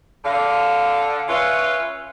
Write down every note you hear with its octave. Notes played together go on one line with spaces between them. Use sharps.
D3 F5
C#4 F4 B4 C#5 E5